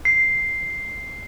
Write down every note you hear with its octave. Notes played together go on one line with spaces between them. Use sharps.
C7